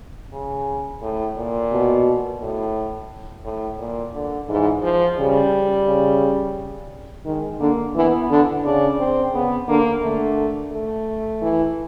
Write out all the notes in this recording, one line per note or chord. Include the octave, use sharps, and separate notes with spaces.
C#3
A2
A#2
B2
A2
A2
A#2
D3
G#2 E3
F3
C#3 G3
C#3
D#3 G#3
D3 A#3
E3 B3
D3
C#3 D4
C4
C#3 B3
D3 A#3
D3 A3
A3
E3